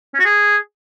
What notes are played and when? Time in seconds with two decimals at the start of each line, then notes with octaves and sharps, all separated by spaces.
0.14 C#4
0.20 F#4
0.25 G#4